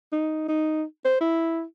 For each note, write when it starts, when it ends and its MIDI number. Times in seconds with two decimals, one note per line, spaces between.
0.13 0.45 63
0.48 0.83 63
1.05 1.20 72
1.20 1.62 64